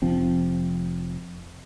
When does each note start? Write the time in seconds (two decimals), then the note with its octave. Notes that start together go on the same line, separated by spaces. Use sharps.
0.02 F1 F3 C4